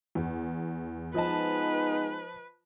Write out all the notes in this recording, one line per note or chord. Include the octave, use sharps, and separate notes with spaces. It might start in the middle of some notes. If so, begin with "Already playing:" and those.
E2
F3 G#3 B3 D#4 B4 D#5 A5